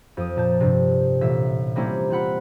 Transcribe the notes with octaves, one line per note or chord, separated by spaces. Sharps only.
F2 D#6
A#2 A5 G6
G2 C3
A1 A#2 E5
G3 A#3 C4 C#4 E4
C4 F4 F#5 B5